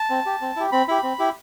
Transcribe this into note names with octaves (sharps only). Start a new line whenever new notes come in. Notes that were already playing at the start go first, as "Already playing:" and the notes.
Already playing: A5
C4
G4
C4
E4 G4
C4 B5
E4 G4 B5
C4
E4 G4